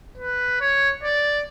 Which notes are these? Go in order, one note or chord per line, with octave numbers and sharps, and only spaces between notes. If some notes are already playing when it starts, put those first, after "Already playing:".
B4
C#5
D5